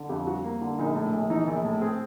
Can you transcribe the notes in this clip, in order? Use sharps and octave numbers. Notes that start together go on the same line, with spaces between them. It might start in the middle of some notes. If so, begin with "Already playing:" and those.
Already playing: D3
F2 G4
G3 F#4
A#3
D3
A#1 D#4
A2
A#1
E3 D#4
A#1
A2
C4 G#4